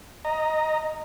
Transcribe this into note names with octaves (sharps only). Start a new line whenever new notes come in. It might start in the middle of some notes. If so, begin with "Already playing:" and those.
D#5 A#5